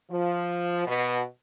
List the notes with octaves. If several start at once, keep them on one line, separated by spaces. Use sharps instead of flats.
F3
B2